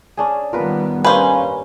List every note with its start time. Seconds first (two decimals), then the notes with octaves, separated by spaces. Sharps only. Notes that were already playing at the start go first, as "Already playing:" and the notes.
0.17 C#4 D4 G#4
0.53 D#3 G3 B3 F4 A#4 B4
1.04 G2 A#3 C#4 B4 C5 F5 G#5